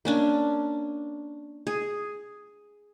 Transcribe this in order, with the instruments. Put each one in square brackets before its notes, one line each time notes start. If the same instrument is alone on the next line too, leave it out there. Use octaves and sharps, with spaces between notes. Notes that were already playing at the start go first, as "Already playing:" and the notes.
[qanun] A#3 C#4 D4
G#4